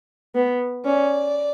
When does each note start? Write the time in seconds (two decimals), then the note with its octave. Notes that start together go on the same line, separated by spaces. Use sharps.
0.35 B3
0.85 C#4 D5